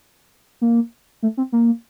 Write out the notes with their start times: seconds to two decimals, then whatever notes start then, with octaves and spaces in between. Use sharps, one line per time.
0.61 A#3
1.23 A3
1.37 C4
1.52 A#3